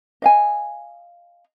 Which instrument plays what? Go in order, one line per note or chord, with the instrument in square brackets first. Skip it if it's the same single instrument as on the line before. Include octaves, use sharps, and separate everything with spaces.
[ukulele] D#5 F5 G#5